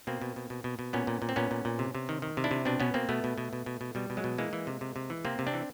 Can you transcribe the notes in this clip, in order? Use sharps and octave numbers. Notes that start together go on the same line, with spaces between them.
B2 A#3 C4
B2
B2
B2
B2
B2
A#2 B3 C#4
A#2
A#2
C4
A#2 B3 C#4
A#2
A#2
C3
C3
D#3
D#3
C3
D4 E4
C3
B2 C4 D4
B2 B3 C#4
B2 A#3 C4
B2 A3 B3
B2
B2
B2
B2
B2
B2 G3
B2
F#3 G#3
B2
E3 G#3 A#3
E3
C3
C3
C3
E3
C3 A#3 C4
C3
C4 D4
E3